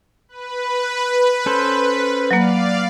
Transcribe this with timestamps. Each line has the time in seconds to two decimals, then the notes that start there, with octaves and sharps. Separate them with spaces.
0.29 B4
1.46 C#4 A4 C5
2.31 F#3 A#3 D5 F5